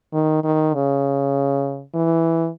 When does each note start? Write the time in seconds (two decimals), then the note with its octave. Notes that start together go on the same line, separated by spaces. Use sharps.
0.13 D#3
0.44 D#3
0.74 C#3
1.94 E3